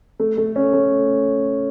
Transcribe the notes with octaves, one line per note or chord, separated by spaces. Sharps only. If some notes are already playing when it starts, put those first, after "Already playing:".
A3
A3
C#4
A3